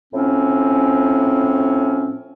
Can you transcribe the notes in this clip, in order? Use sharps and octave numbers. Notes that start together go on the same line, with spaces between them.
A2 F3 C4 C#4